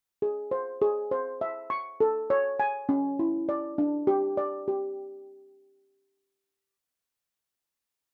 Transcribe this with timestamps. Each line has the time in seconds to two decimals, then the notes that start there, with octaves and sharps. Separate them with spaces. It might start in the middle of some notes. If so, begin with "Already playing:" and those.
0.22 G#4
0.51 C5
0.82 G#4
1.11 C5
1.41 E5
1.70 C#6
2.00 A4
2.30 C#5
2.60 G#5
2.89 C#4
3.19 E4
3.49 D5
3.78 D4
4.07 G4
4.37 D5
4.68 G4